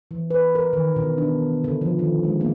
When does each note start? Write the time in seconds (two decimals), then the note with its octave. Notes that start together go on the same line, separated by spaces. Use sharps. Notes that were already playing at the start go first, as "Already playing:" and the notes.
0.11 E3
0.30 B4
0.55 A#4
0.73 D#3
0.96 B2
1.18 D4
1.64 D3
1.81 F3
1.99 D#3
2.24 G#3
2.41 A#3